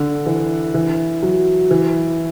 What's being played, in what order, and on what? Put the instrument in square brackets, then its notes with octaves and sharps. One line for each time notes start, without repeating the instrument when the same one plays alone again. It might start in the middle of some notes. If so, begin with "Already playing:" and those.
Already playing: [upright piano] D3
E3
E3
F#3
E3